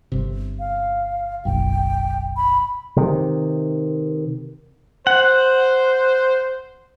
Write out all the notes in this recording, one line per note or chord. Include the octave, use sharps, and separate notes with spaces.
G1 C3
F5
F#1 B1 F#2 G5
B5
C3 D#3
C5 F#5